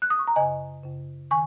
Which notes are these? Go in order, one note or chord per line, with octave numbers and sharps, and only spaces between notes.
F#6
D#6
C#6
A#5
F#2 C#3 D#5 G#5
F#2 C#3
D#3 G#5 C#6